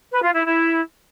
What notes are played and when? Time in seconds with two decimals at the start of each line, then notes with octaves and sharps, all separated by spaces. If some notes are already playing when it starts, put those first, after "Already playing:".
0.12 B4
0.23 F4
0.34 E4
0.45 E4